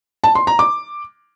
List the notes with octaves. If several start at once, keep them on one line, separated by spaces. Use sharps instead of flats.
A5
C6
A#5
D6